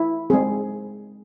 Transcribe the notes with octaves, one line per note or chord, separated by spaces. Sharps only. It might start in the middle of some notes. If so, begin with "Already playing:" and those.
Already playing: E4
G#3 C4 G#4